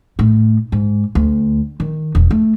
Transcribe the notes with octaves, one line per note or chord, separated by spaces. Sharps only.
A2
G#2
D2
D#3
E1
A3